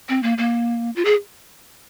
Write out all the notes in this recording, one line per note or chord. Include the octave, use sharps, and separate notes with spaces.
C4
A#3
A#3
F4
G#4